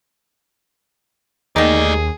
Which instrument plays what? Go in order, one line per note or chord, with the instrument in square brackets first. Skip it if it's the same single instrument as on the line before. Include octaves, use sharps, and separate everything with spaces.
[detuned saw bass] D#2 [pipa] D#3 D#4 [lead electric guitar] A3 D5 [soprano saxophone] G#4